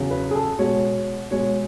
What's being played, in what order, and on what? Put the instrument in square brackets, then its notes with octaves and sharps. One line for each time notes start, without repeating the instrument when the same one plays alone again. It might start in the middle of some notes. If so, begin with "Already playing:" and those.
Already playing: [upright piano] E2 C#3 F#3
B4
G#4
A4
B2 G#3 C#5
B2 G#3 C#5